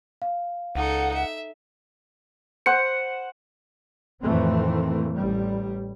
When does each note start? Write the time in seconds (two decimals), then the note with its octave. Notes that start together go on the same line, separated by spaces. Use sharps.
0.22 F5
0.75 C#2 D#4 A4 F#5
1.13 E5
2.66 C5 F#5 C#7
4.22 F2 A2 D#3 E3 A3 C4
5.16 A1 G3